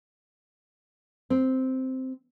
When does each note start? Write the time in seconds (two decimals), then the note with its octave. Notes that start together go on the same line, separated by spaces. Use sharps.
1.30 C4